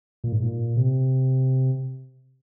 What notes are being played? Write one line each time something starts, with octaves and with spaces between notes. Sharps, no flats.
A#2
G#2
A#2
C3